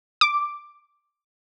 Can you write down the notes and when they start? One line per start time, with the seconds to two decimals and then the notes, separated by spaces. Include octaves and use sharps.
0.21 D6